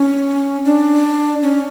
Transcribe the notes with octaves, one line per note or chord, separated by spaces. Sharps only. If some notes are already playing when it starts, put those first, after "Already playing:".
Already playing: C#4
D4
C#4